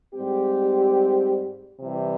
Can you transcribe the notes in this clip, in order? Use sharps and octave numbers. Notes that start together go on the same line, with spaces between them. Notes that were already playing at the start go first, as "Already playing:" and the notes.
G#2 G3 C4 G4
C3 E3 G3